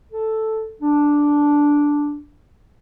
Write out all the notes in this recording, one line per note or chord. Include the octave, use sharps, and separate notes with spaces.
A4
D4